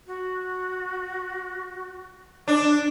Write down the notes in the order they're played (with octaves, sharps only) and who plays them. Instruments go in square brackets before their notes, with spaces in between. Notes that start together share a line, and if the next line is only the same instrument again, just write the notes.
[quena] F#4
[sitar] D4 [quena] D6